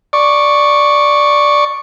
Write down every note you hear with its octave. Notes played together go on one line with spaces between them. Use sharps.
D5 C#6